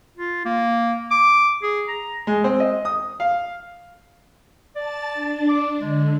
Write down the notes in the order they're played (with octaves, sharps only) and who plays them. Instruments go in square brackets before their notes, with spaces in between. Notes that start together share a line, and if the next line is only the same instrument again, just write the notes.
[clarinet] F4
A#3
D6
G#4
A#5
[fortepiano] G#3
C4
D#5
D#6
F5
[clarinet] D5 [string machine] A5 A6
[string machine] D4
[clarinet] D6
[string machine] D3 [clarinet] G#3